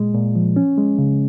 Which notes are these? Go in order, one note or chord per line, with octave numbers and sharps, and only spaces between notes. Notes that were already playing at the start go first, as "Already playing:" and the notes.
Already playing: A#2 G#3
A#2
F3
C#4
G#3
C#3